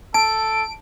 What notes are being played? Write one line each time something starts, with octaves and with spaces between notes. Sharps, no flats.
A4 A5 D7